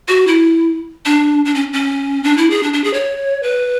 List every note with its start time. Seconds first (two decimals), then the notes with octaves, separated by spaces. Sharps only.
0.08 F#4
0.27 E4
1.06 D4
1.45 D4
1.55 C#4
1.73 C#4
2.24 D4
2.37 E4
2.50 G#4
2.63 D4
2.73 D4
2.84 G#4
2.93 C#5
3.43 B4